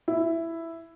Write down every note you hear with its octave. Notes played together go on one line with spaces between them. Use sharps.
E4